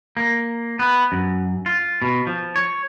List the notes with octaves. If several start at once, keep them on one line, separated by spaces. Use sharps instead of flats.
A#3
B3
F#2
F4
B2
F3
C#5